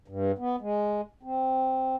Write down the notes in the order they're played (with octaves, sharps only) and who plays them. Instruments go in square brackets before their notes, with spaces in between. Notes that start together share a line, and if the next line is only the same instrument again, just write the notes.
[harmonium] G2
B3
G#3
C4